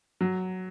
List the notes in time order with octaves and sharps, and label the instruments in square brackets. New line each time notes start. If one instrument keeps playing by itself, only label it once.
[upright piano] F#3